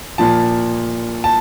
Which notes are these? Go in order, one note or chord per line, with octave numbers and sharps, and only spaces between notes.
A#2 F3 A5
A5